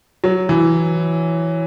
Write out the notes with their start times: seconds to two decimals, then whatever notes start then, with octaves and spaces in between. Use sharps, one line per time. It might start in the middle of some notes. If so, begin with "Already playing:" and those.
0.24 F#3
0.49 E3